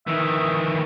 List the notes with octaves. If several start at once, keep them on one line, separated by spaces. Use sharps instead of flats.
D#3 E3 E5